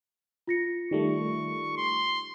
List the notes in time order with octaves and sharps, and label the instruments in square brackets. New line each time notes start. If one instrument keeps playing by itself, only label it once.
[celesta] F4 A#6 C#7
[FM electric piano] D#3 G3 A3 [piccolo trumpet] C#6
[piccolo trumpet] C6